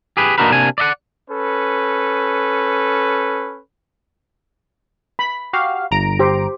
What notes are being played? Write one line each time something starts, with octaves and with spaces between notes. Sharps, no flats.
G4 G#4 B4
A#3 D4 D#4 F#4 A#4 B4
C3 A#3 D4 G#5
D5 D#5 F#5
C#4 A4 B4
B5
F#4 G4 F5
G1 A#5 D7
G4 C5